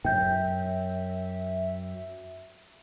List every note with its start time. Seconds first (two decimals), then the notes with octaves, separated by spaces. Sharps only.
0.05 F#2 E5 G5 G6